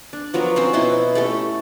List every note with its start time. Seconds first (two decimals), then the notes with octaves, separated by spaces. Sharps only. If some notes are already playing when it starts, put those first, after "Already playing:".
0.13 D4
0.34 F3 F#3 B3 A#4
0.56 C4 C#4 C5
0.73 B2 B3 E4 C6
1.15 A3 C#4 G4 A4